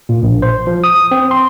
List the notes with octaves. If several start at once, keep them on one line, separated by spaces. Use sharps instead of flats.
A#2
A#1
C5
F3
D#6
C4
C6